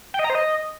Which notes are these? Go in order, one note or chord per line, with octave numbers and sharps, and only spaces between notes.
G5
D#5
A#5
C5
D#5